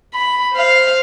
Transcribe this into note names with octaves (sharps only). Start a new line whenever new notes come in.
B5
C5 F5